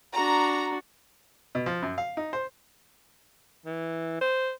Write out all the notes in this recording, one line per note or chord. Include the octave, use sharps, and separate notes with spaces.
D4 F#4 A#5
B2
F3
F#2
F5
D#4
C5
E3
C5